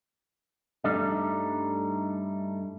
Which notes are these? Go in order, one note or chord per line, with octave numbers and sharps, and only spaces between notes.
G2 G3 A3 D4 D#4